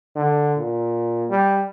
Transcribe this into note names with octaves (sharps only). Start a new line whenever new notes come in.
D3
A#2
G3